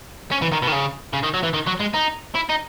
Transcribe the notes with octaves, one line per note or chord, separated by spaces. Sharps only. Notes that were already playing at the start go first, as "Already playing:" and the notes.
C#4
E3
D#3
B2
D#3
C#3
C#3
D#3
F#3
E3
D#3
F#3
G#3
D#4
E4
D#4